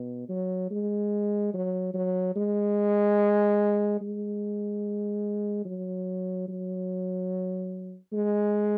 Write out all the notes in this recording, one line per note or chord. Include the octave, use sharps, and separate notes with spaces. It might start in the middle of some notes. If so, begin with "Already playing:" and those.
Already playing: B2
F#3
G#3
F#3
F#3
G#3
G#3
F#3
F#3
G#3